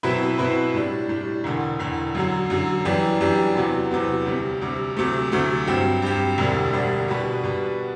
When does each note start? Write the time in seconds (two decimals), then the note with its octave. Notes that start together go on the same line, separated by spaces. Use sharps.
0.03 B2 F#3 C4 E4 B4
0.38 B2 F#3 C4 E4 B4
0.74 A2 G3 D4
1.09 A2 G3 D4
1.44 E1 E2 D3
1.79 E1 E2 D3
2.15 F#2 D3 F#3
2.50 F#2 D3 F#3
2.85 F#2 E3 G3 D4 G4
3.21 F#2 E3 G3 D4 G4
3.56 E2 C3 F#3 B3
3.91 E2 C3 F#3 B3
4.26 D2 C3 G3
4.61 D2 C3 G3
4.96 D2 C3 F#3 A3
5.32 D2 C3 F#3 A3
5.67 G2 F#3 C4 G4
6.02 G2 F#3 C4 G4
6.38 E1 D2 D3 G3 D4
6.73 E1 D2 D3 G3 D4
7.08 B2 G3 D4 F#4 B4
7.43 B2 G3